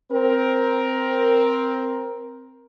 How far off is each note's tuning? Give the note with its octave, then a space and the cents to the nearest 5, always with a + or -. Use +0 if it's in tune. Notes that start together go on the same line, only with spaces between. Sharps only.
C4 +0 A#4 +10